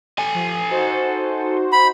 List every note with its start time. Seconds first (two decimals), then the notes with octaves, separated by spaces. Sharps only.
0.19 A4 G#5
0.34 F3
0.70 D#4 F#4 C5
1.72 B5